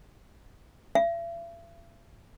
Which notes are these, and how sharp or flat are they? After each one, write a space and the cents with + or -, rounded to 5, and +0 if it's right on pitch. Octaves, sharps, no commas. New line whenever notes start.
E5 +45